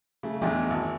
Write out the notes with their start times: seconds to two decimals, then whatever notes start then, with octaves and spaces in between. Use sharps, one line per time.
0.23 C#3 A3
0.42 A1 E2 A3 D4 D#5 G5
0.68 G#1 E4